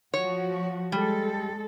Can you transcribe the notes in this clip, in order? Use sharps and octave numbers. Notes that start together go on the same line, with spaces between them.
F3 F#4 C#5
G3 G#3 A4